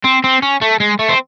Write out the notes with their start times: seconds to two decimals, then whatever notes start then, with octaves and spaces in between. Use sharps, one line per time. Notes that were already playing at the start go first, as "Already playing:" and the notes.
0.04 C4
0.24 C4
0.42 C#4
0.61 A3
0.80 G#3
0.99 A3
1.09 C4